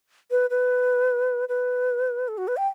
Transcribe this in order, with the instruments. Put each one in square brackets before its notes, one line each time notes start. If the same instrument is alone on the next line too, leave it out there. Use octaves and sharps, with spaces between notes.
[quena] B4
B4
B4
A4
F#4
B4
G5